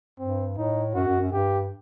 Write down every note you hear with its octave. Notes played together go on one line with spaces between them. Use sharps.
G2 C4
A2 D#4
F#2 F#4
F#2
F#2
G2 G4